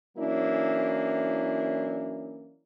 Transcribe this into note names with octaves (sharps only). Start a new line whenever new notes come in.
E3 F#3 A#3 C#4 D4 E4